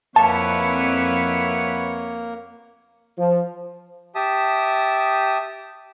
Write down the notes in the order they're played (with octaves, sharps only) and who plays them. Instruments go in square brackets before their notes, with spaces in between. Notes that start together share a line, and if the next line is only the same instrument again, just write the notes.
[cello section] F2 B4 [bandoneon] A#3 [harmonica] E4 C#5 F#5 [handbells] A5
[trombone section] F3
[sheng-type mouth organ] G4 E5 A5 D#6